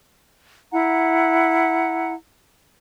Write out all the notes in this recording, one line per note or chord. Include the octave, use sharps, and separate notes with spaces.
E4 F#5 A#5